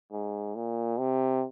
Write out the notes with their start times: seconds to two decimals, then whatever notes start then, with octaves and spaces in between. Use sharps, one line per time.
0.12 G#2
0.55 A#2
0.99 C3